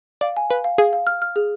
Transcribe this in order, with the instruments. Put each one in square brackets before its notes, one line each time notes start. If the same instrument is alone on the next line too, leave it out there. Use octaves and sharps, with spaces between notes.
[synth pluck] D5 [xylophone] F5
[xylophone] G#5
[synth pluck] B4 [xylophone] F5
[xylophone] F5
[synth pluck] G#4 [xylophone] F5
[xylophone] F5
F6
F6
G#4